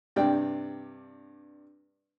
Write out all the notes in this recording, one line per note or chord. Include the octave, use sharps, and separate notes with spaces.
G2 C3 D5 G5